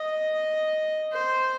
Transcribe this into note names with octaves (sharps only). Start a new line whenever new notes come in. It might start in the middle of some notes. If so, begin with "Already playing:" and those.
Already playing: D#5
C5